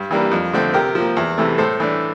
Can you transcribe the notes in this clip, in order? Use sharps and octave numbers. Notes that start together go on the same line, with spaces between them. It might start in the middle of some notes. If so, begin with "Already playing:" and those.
Already playing: G2
E3 G3 A#3 D4
F2
D3 A3 C4
C3 G4 A#4
F3
A#3
E2
C3 E3 A3
A2 A4 C5
E3 A3 D4